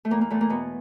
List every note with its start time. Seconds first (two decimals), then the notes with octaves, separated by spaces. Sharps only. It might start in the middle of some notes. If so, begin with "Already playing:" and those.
0.05 A3
0.11 E2 A#3
0.21 A#3
0.30 E2 A3
0.41 A#3
0.50 B2 B3